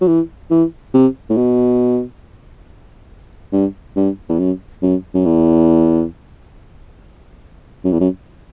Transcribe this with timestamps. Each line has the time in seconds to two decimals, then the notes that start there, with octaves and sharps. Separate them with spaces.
0.01 F#3
0.07 E3
0.51 E3
0.94 C3
1.30 A2
1.37 B2
3.52 G2
3.96 G2
4.29 E2
4.39 F#2
4.82 F#2
5.14 F#2
5.26 E2
7.85 F#2
7.92 E2
8.00 F#2